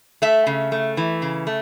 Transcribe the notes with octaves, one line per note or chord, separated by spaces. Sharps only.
A3 E5
C#3
A3
E3
C#3
A3